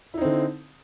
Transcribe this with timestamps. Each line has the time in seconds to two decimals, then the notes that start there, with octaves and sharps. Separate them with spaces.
0.14 E4
0.18 D#4
0.21 C4
0.25 D3